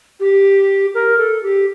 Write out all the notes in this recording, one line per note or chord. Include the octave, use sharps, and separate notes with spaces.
G4
A#4
A4
G4